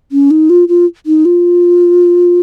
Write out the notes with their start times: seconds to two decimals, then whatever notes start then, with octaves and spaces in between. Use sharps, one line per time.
0.12 C#4
0.31 D#4
0.50 F4
0.68 F4
1.06 D#4
1.25 F4